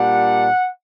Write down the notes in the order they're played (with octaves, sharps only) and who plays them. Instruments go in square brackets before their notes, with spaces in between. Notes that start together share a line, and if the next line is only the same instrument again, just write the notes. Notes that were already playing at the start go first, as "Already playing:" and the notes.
Already playing: [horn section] A#2 G3 D4 F#5